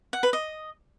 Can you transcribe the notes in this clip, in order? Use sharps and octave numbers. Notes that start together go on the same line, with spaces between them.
F#5
B4
D#5